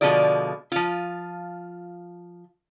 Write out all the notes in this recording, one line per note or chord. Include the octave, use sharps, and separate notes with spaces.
B2 D3 F3 G#3 F4 D5
F3 F4